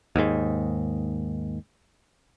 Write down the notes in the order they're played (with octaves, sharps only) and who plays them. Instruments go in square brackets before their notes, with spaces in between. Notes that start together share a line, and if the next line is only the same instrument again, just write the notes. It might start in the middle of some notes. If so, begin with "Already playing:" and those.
[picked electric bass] D#2 G#2